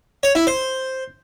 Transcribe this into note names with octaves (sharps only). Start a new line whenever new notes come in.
C#5
E4
C5